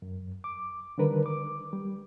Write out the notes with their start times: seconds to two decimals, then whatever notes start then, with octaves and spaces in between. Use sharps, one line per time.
0.02 F#2
0.44 D6
0.98 D3 D#3 G3 D4 A#4 B4
1.26 D6
1.73 G3